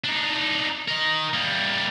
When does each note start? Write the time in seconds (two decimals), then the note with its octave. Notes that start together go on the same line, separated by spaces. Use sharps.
0.04 D4 D#4
0.88 A#4 D#5
1.34 G3 A#3